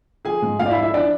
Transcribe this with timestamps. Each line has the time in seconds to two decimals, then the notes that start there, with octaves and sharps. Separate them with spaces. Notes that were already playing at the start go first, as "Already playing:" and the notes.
0.25 F3 G#4 G#5
0.42 G#2
0.59 G#2 F4 F5
0.66 D5
0.71 E4 E5
0.77 F3
0.83 E4 E5
0.94 F3 D4 D5